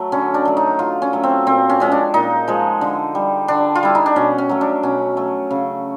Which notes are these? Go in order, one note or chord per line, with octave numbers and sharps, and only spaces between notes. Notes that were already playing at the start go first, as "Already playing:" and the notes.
Already playing: F#3 A3
D3 C#4
D4
F#3 A3
D#4
D3 F4
C#4
F#3 A3
C4
A#2 C4
C#4
F3 G#3 C#4
D4
A#2 D#4
F3 G#3
D3
G3
D3 D4
F4
G3 E4
D#4
D4
B2 C#4
C#4
F#3 A3
D4
B2 C#4
F#3 A3
C#3